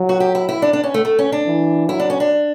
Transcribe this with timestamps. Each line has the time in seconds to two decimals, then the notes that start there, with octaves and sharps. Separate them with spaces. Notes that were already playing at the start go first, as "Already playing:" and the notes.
Already playing: F#3
0.09 F#4
0.20 G4
0.35 E4
0.49 E4
0.62 D4
0.73 D4
0.84 C#4
0.94 A3
1.05 A3
1.19 C#4
1.32 D4
1.47 E3
1.88 F#3 E4
2.00 D4
2.10 C#4
2.20 D4